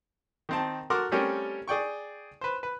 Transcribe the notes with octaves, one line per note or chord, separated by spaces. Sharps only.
D#3 C4 A5
F#4 A4 A#4 F#5 C6 D6
G3 A3 C4 C#4 G4 A#4
G#4 D5 G5 C#6
B4 C5
B4